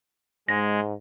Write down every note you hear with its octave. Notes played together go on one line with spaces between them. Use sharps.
G#2 G#3 A#6